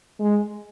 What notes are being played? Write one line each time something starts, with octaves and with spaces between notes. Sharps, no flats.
G#3